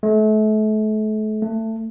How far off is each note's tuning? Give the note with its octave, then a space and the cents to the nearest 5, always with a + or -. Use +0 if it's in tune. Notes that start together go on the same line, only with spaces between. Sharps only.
A3 -35
A3 +20